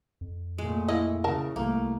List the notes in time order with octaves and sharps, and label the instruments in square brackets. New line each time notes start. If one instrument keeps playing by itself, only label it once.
[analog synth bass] F2
[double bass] A#2 A3 [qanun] G#3
[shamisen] A#3 D#5 [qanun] E4
[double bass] C#3 [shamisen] A#4 A5
[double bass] C2 A3 [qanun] A#3